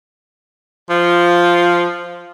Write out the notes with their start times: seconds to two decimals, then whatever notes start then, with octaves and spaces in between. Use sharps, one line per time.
0.90 F3